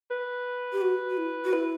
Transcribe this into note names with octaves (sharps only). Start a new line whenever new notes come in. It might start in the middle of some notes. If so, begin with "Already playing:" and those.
B4
G4
F#4
F#4
E4
F#4
E4 B4